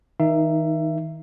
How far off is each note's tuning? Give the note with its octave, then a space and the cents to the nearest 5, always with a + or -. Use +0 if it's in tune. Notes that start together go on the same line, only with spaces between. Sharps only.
D#3 +35 D#4 +0 E5 +20